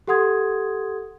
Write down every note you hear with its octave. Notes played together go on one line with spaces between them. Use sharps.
G4 A4 F#5 C6 D#6 G#6